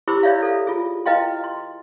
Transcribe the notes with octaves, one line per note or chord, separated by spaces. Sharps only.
E4 G4 C5 B5 D6 E6
E4 C#5 D5 E5 F5
A4 F5
F4 G#4
E4 B4 D#5 F5 G5 C6
C6